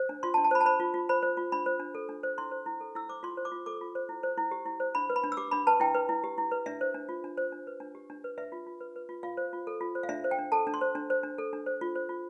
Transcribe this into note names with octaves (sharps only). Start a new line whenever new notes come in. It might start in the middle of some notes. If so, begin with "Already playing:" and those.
Already playing: C5
D4
F4 C6
A5
D4
A5
C5 B5
A5
C5 B5
F4
F4
C5 B5
C5
F4
D4 B5
C5
D4
A4
D4
C5
E4 C6
C5
E4
A4
E4 E6
C5 D6
F4 C6
C5
D6
F4
A4 D6
F4
C5
E4
C5
E4
G4
E4
C5
D4 B5
B4
B5
D4
E6
G4 D6
D4 B5
B4 A5
E4 G5
B4
E4
G4
E4
B4
D4 E5
C5
D4
F4
D4
C5
D4
B4
D4
G4
D4
B4
B4 E5
F4
F4
B4
B4
F4
F4 F5
C5
F4
A4
F4
C5
F5
D4 E5
C5
G5
D4
A4 A5
D4
C6
C5
D4
C5
D4
A4
D4
C5
F4
C5
F4